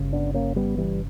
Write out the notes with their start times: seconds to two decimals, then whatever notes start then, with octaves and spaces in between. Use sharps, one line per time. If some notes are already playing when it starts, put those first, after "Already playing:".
Already playing: G1 C#3
0.13 B3 D4
0.34 A#3 C#4
0.56 G3 B3
0.78 E3 G3